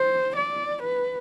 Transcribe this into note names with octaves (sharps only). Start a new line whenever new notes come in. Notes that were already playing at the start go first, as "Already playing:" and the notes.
Already playing: C5
D5
B4